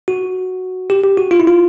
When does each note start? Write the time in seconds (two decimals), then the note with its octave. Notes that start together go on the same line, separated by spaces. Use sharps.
0.08 F#4
0.90 G4
1.03 G4
1.17 F#4
1.31 F4
1.40 E4
1.47 F4